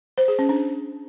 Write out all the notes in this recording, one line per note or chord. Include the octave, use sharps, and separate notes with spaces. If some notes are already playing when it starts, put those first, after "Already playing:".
C5
G#4
C#4
D4